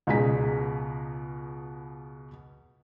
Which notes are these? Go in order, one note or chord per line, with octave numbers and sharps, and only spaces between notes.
C#2 B2 G#4 G#5 A#5 B6